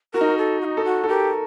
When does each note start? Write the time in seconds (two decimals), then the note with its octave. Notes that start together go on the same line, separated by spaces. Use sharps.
0.14 F#4 A#4
0.21 D#4
0.28 F#4
0.38 A4
0.61 F#4
0.65 D#4
0.77 A4
0.85 F#4
1.04 A4
1.09 G4 A#4